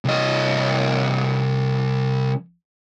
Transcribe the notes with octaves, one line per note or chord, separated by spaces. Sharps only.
C2 D#5